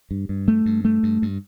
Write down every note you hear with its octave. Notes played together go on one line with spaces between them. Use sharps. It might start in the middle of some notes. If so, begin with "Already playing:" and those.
G2
G2
A3
G2
A3
G2
G2